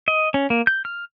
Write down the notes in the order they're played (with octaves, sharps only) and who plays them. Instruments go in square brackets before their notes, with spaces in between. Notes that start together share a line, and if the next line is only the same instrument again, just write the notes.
[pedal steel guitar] D#5
C#4
A#3
G6
F6